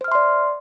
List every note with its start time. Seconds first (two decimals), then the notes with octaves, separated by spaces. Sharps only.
0.01 C5
0.04 F6
0.08 E5
0.12 C6
0.15 D5